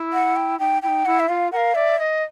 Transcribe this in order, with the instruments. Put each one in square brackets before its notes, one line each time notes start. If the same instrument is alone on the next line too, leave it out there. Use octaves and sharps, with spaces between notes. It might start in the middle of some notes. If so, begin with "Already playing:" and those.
Already playing: [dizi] E4
[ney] F#5
G5
[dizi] D#4 [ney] G5
[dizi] E4 [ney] G5
[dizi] D#4
[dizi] E4 [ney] F#5
[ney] E5
[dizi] F4 [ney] F5
[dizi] A#4 [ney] F5 F#5
[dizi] D5 [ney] E5
[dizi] D#5